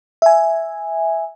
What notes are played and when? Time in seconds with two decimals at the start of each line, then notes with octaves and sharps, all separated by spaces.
0.22 E5 G#5